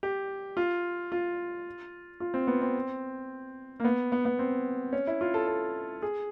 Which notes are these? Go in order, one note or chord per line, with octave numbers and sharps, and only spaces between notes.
G4
F4
F4
F4
C4
B3
C4
A#3
B3
B3
B3
C4
C#4
E4
F4
A4
A4
G#4